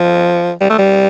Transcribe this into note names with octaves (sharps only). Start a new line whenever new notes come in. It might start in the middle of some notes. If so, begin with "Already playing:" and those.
Already playing: F3
G3
A3
G3